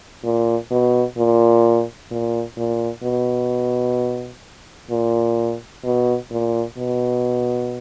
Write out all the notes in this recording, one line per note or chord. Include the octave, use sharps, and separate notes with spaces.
A#2
B2
A#2
A#2
A#2
B2
A#2
B2
A#2
B2